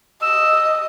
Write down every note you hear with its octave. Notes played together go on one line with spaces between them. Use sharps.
D#5 E6